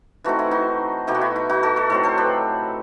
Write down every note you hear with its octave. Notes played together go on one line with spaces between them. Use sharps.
E3 A3 C4 D#4 F#4
E4
D#4 F#4
B2 A3 D#4 E4 G4
F#4
E4
E4
D#4 F#4
F#4 A4
F#4 A4
A2 F#3 C4 A4 C5
A4 C5
G4 B4